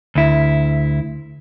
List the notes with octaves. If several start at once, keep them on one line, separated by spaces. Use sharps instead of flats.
D2 E4